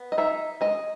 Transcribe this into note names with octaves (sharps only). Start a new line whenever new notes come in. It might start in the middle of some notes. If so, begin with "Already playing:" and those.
Already playing: B3
D#5
D#4 E5
G#3 D#5